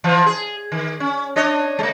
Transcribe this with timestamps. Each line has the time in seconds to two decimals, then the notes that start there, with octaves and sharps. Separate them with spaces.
0.04 E3 F3 F4
0.26 G#4
0.72 D#3
1.00 C#4
1.36 D4 C#5 D#5
1.79 G#3 A3